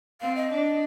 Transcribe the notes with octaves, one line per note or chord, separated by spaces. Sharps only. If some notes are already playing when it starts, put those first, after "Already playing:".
C4 F5
D#5
D4